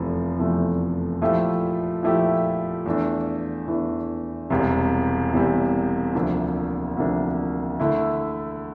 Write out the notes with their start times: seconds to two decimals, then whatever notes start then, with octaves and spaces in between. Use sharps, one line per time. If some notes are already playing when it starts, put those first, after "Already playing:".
Already playing: F1 E2 C3 F3 A3
0.39 F1 E2 C3 F3 A3
1.21 A#2 F3 A3 E4 G4
2.03 A#2 F3 A3 E4 G4
2.86 E2 E3 A3 D4
3.68 E2 E3 A3 D4
4.50 E1 E2 C3 G3
5.33 E1 E2 C3 G3
6.15 D2 C3 F3 A#3 D4
6.97 D2 C3 F3 A#3 D4
7.80 D3 A3 E4